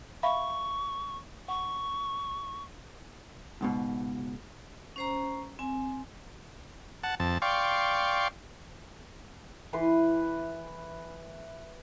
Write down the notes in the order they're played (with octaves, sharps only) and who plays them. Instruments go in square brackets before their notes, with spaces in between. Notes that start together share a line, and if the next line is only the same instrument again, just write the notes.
[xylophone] E5 F5 B5 [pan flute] C#6
[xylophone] F#5 [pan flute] C#6
[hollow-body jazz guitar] C#2 G#2 B2
[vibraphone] C#4 C5 A#5
C4 G#5
[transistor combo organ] F#5 A5
F2 A5
D5 F5 G5 C6 C#6
[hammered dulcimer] E3 B4 C6